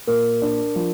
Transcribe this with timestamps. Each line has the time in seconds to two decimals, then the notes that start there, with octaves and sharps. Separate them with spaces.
0.07 A#2 A#4
0.42 D4
0.76 F3